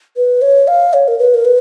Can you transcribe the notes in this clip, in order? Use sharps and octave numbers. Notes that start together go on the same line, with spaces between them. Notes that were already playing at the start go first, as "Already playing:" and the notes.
B4
C#5
F5
C#5
A#4
B4
A#4
B4